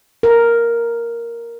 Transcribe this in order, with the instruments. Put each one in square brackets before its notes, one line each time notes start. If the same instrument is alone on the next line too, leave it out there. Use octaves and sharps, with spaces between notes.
[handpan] A#4